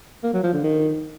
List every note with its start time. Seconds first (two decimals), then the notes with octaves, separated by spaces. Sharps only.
0.24 A#3
0.34 F#3
0.44 F3
0.54 D3
0.64 D#3